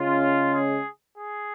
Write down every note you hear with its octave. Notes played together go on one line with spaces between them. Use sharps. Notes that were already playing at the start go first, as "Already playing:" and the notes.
Already playing: C#3 G#3 C#4 F4
G#4
G#4